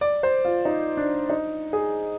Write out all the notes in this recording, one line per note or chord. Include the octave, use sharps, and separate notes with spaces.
D5
C5
F4
D#4
D4
D#4
G#4